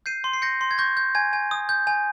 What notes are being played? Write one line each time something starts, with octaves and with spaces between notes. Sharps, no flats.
G6 C7 D#7
C6
C7
G6 A#6 C#7
C6
G#6
C#6 G6 A#6
G6
G#5 G#6
G#5
D#6
G6
G#5